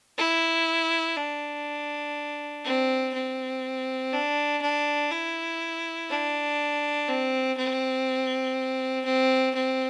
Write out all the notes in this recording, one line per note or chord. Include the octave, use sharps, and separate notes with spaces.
E4
D4
C4
C4
D4
D4
E4
D4
C4
C4
C4
C4